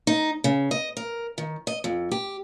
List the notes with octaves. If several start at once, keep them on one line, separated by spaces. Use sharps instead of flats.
D#4
C#3
D#5
A#4
D#3
D#5
F2
G4